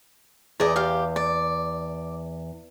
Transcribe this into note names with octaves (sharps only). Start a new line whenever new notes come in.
E2 G#4 D5 D#5
G4 F5
D5